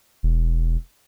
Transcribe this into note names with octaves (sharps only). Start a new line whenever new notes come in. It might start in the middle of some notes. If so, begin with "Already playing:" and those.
E1